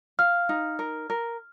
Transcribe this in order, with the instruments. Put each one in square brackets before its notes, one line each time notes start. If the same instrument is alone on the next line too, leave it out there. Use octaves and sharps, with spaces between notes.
[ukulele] F5 [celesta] F6
[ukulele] D#4
A#4
A#4